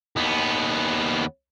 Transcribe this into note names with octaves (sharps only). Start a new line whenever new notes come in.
D#2 B3